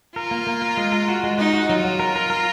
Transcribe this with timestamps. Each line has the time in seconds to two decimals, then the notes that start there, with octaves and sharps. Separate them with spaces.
0.16 F4 A#4
0.31 A#3
0.47 A#3
0.62 A#4
0.77 G#3
0.92 A#4
1.08 F#4
1.23 G#3
1.38 D#4 F#4
1.53 F#4
1.69 F#3 F4
1.85 F#3
1.99 A#4
2.16 A#4
2.30 A#4